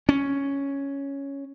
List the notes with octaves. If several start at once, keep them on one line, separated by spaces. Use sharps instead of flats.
C#4